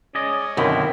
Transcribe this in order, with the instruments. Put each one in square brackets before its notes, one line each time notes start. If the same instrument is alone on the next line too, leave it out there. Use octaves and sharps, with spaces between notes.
[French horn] C#4 [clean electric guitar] G#4 D5 D#5
[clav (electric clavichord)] F#2 B2 D3 [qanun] D#3 [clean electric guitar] C4 E4 F4